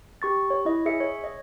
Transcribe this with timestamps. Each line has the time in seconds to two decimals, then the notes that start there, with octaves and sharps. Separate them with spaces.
0.22 G4 C#6 A6
0.50 C#5
0.65 E4 D#5
0.86 G#4 E5 C#7
1.00 C#5
1.24 D#5